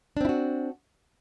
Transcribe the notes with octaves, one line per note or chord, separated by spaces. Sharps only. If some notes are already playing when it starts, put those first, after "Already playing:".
C4 D4 E4 F#4